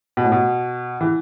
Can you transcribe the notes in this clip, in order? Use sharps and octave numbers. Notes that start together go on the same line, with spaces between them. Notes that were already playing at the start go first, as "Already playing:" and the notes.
B2
A2
B2
E3